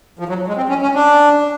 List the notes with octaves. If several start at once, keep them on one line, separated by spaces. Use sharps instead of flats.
F3
F#3
G#3
C4
C#4
C#4
D4